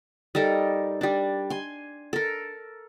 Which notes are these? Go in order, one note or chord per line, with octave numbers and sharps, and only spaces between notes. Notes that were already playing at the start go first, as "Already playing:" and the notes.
G3 D#4 A4 A#4
G3 D4
G#5 C6
A4 A#4